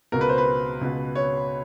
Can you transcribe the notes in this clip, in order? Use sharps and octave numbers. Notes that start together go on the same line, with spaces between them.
C#2 B2 A#4
B4
C5
B4
C#2 B2
C#5